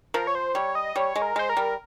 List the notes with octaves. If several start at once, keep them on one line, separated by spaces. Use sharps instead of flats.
F3 A#4
C#5
C5
G3 C#5
D#5
G3 C#5
G#3
A#4
G#3 C5
A#4
G3